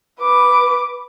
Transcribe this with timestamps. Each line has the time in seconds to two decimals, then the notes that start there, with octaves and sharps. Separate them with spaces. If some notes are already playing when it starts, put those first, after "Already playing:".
0.21 B4 D6